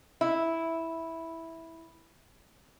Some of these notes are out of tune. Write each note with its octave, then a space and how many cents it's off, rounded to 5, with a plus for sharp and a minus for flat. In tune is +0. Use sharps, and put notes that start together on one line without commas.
E4 -5